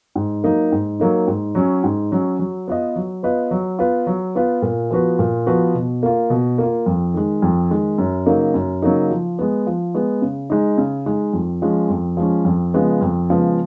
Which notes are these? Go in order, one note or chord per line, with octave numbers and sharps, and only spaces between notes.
G#2
F#3 A#3 D#4
G#2
F#3 A#3 D#4
G#2
F#3 C#4
G#2
F#3 C#4
F#3
B3 F4 B4 D#5
F#3
B3 F4 B4 D#5
F#3
B3 F4 B4
F#3
B3 F4 B4
A#2
F3 B3 F#4 B4
A#2
F3 B3 F#4 B4
B2
A#3 F4
B2
A#3 F4
F2
D#3 G#3
F2
D#3 G#3
F#2
C#3 F#3 A#3 D#4
F#2
C#3 F#3 A#3 D#4
F3
G#3 B3
F3
G#3 B3
C#3
G#3 D#4
C#3
G#3 D#4
F2
F3 G#3 C#4
F2
F3 G#3 C#4
F2
C#3 F3 G#3 B3
F2
C#3 F3 G#3 B3